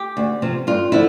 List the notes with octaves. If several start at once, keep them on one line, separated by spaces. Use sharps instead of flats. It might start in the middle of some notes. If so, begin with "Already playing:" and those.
Already playing: G4
D2
C3 F3
G2 F4
D3 F3 E4